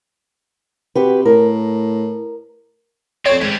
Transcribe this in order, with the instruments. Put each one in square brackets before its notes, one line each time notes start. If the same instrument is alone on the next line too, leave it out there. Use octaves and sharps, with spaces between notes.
[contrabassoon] C3 [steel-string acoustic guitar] F#4 G4 B4
[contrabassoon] A2 [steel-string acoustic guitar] A#4
[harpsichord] F2 D5 [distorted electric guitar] C4 [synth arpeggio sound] C#5
[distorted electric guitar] D#2 G3 [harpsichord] G#2